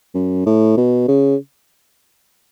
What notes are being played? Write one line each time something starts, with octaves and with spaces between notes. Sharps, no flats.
F#2
A2
B2
C#3